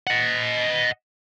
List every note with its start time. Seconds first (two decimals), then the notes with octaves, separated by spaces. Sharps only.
0.07 D#5 F#5